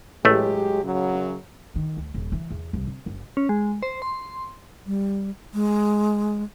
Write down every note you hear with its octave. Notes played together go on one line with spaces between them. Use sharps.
A1 F#3 G#3 A3 G4
F#2 C#3 F#3
D#3
D2
D#1
E3
E2
C2
C4
F#1
C#4
G#3
C5
C6
G3
G#3